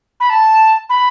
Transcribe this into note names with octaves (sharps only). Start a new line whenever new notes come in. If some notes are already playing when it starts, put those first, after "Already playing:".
B5
A5
B5